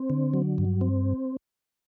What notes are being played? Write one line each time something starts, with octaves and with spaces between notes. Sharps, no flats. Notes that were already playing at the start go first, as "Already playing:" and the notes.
Already playing: C4
D3
F#3
G2
C4